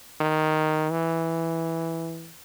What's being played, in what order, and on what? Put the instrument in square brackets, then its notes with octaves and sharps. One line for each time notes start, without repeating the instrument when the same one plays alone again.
[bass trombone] D#3
E3